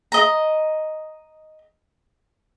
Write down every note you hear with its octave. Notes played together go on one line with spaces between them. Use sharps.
D#5 A#5